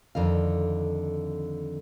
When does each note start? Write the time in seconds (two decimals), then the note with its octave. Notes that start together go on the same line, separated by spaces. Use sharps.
0.15 F2 D3 D#3 F5